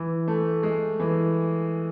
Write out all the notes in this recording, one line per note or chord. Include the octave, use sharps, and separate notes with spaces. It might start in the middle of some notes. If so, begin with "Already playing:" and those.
Already playing: E3
A3
G#3
E3